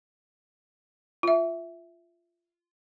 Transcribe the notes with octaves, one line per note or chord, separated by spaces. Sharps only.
F4 E5